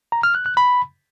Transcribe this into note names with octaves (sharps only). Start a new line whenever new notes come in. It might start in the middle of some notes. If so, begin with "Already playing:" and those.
A#5
F6
F#6
F#6
B5